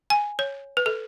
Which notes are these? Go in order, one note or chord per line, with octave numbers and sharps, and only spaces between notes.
G#5
C#5
B4
A4